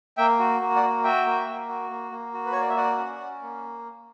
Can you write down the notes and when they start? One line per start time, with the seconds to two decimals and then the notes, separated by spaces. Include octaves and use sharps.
0.17 A#3 E5 G5
0.39 F#4
0.61 A#3
0.76 D5 F#5
0.83 F#4
1.04 F#4 E5 G5
1.26 A#3
1.48 A#3
1.68 F#4
1.90 A#3
2.11 A#3
2.33 F#4
2.46 B4
2.52 A#3 C#5
2.61 D5
2.69 E5
2.77 F#4 D5 F#5
2.98 C#4
3.19 C#4
3.42 A#3